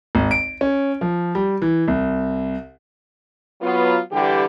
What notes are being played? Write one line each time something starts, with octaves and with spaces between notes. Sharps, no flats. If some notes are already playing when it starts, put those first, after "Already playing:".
G#1
D7
C#4
F3
G3
E3
C2
F#3 B3 F4
D3 E3 G3 G4